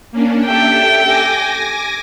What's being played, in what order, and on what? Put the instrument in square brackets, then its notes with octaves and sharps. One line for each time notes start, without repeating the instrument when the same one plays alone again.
[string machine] A#3 C#4 D4
[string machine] G4 A4 E5 [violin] G5
[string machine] G#5 D6 A#6